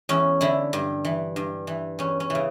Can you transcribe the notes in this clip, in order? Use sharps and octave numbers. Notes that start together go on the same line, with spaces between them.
E2 C#4
D3 E4
G2
E3
G2
E3
E2 C#4
C#4
C#3 E3